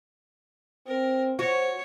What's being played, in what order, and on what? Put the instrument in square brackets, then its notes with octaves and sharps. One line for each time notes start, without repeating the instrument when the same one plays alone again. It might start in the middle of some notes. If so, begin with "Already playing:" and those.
[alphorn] C4 [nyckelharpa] A#4
[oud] F#4 [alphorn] C5 [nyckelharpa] C#5